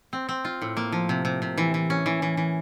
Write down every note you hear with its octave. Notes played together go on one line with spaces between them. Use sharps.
C4
C4
F4
A2
A#3
F3
C3
C3
C3
E3
E3
C#4
E3
E3
E3